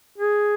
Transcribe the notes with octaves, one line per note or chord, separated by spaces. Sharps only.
G#4